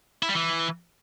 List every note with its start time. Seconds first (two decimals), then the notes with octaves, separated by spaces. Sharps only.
0.23 E4
0.29 G3
0.35 E3